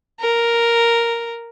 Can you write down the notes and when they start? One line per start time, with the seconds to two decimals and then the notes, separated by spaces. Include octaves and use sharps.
0.21 A#4